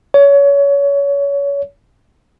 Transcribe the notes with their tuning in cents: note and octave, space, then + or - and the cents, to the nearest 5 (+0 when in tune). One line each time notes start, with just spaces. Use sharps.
C#5 +25